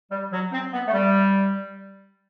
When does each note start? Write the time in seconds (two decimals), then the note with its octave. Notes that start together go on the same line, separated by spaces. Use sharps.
0.11 G3
0.32 F#3
0.52 C4
0.73 B3
0.87 A3
0.93 G3